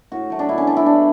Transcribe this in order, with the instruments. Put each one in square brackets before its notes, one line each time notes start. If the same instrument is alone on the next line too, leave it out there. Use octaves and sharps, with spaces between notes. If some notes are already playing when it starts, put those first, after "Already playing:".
[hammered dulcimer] A2 F#4
F#3 A3
D4
B2 E4
C#4
G3 B3 D4
E4
B2 D4